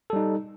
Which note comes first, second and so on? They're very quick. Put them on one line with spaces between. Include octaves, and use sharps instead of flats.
A4 G3 D#4